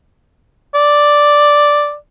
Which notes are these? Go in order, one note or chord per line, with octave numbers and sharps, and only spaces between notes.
D5